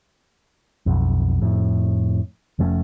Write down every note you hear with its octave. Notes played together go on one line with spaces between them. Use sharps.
B1 F2
F2 A2
F1 F3 A3 C#4